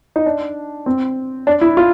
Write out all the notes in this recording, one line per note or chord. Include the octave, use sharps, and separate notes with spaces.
D#4
D4
C4
D4
E4
F4